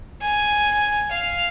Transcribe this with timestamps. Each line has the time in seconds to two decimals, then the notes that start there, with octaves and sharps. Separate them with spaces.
0.21 G#5
1.11 F5